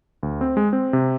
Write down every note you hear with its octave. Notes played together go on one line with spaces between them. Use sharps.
D2
C4
G#3
C4
C3